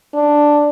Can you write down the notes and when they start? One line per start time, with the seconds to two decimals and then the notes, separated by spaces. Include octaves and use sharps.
0.14 D4